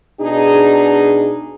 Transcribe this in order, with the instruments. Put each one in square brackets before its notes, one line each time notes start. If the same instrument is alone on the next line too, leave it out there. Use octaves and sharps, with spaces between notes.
[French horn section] B2 D4 D#4 G#4